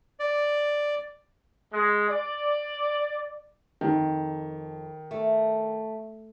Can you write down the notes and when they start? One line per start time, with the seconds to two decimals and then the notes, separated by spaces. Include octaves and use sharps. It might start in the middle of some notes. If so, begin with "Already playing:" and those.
0.19 D5
1.73 G#3
2.09 D5
3.81 F2 D#3
5.11 A3